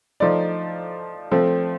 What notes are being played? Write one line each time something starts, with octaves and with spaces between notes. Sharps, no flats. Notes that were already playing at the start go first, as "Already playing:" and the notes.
F3 A3 D#4 D5
F3 A3 C4